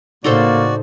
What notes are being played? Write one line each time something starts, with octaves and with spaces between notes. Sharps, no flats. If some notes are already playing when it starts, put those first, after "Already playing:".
A2 C#3 A#3 D#4 F#4 A4 C5 D5